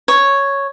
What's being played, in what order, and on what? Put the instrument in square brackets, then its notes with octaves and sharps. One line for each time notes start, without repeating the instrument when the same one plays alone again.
[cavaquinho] C#5